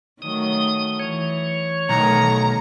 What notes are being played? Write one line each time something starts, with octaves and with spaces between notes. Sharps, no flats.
D#3 F#3 A3 D#6
E3 C#5
B1 D#3 A3 A#5